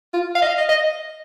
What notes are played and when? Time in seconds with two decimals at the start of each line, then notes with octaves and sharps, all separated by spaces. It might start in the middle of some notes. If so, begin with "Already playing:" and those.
0.14 F4
0.35 F5
0.42 D#5
0.47 F5
0.58 D#5
0.69 D#5